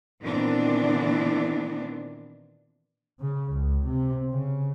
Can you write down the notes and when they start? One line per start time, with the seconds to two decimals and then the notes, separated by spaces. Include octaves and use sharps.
0.22 A#2 D#3 E3 B3 C4 D4
3.22 C#3
3.55 C#2
3.86 C3
4.29 C#3